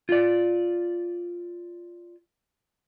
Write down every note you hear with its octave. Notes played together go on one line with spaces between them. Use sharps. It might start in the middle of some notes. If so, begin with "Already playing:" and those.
F4 D5